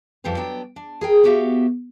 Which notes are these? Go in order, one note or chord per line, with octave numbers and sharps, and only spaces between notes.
F2 E3 F3 G3 G4 B4
F#3 B3 D4 G5
D4
G#4 A#4 G5
B3 F#4 G4 D5 E5 F5